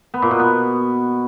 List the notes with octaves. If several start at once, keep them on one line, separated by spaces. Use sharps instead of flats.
B3
A#2
B2
B3